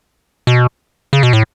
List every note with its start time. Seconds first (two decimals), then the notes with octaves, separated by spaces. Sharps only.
0.47 B2
1.13 C#3
1.23 B2
1.33 A2